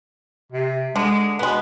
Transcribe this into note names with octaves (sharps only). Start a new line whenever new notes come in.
C3
D3 G#3
B2 G#3 B3